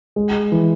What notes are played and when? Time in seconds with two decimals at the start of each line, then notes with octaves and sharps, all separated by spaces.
0.16 G#3
0.52 E3